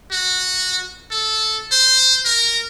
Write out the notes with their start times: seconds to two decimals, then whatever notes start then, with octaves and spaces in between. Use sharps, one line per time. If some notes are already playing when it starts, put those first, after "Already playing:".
0.11 F#4
1.11 A4
1.72 C5
2.25 A#4